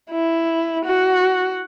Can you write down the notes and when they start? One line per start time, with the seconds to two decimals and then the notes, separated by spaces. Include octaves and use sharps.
0.10 E4
0.85 F#4